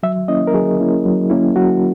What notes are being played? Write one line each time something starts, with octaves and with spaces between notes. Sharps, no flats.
F#3 E5
A#3 C#4 E4 D#5
A#4
F#3 G#4
A#3 C#4 E4
F#3
A#3 C#4 E4
F#3 F#4